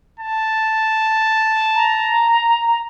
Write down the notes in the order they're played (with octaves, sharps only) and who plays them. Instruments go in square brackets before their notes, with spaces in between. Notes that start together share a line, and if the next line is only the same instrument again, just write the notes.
[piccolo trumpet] A5
[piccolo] A#5